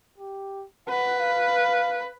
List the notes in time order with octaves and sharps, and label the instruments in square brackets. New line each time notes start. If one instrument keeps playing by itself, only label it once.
[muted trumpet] G4
[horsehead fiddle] B4 [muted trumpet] F#5
[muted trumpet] F5